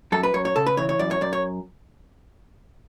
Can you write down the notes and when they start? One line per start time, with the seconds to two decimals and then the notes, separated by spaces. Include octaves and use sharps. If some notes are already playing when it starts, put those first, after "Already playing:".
0.12 F#2 A4
0.23 B4
0.34 F#2 C#5
0.45 C#5
0.56 C#3 A4
0.66 B4
0.77 E3 C#5
0.89 C#5
0.99 F#2 D5
1.11 C#5
1.21 F#2 D5
1.33 C#5